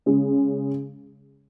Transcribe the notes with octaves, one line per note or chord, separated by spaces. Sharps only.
C#3 G#3 C#4